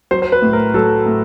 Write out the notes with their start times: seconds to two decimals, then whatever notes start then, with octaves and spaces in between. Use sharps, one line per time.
0.11 F#3 C5
0.22 C5
0.32 B4
0.42 A2
0.53 A#4
0.74 F#3 A4
1.06 A2